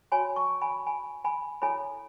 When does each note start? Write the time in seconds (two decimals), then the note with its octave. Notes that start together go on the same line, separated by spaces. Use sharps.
0.12 F#4 C#5 G#5 B5
0.36 A5 C#6
0.62 G#5 B5
0.87 G#5 B5
1.24 G#5 B5
1.62 E4 A4 C#5 G#5 B5